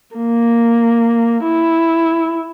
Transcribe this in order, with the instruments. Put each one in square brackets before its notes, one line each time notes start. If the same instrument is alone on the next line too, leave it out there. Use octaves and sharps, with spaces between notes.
[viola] A#3
E4